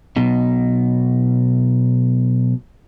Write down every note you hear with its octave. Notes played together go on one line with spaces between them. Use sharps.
B1 B2 D#4